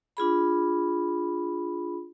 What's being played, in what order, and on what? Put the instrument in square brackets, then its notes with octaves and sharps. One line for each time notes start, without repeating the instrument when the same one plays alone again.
[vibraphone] D4 F4 G#4 B5